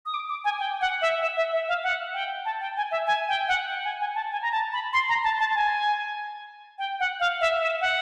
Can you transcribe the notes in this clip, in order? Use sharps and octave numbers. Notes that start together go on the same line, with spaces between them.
D#6
D6
D6
G#5
G5
F#5
E5
E5
E5
E5
F5
F#5
G5
A5
G5
G#5
E5
G#5
G5
F#5
G5
G#5
G#5
A5
G#5
A#5
A5
B5
C6
A#5
A5
A5
G#5
G5
F#5
F5
E5
E5
F#5